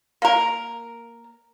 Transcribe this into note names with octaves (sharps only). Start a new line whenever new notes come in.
A#3 A#4